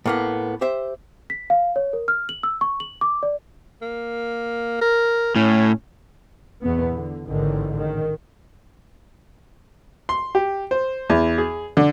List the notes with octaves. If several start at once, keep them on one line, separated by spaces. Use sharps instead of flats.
A2 A#3 B3
G4 C5 E5
B6
F5
C#5
A#4
F6
F#7
E6
C#6
F#7
D6
D5
A#3
A#4
A2 C#4
E2 B2 B3
D3
A1 G#2 D3 D#3
D#3
C6
G4
C5
E2
G#4
D3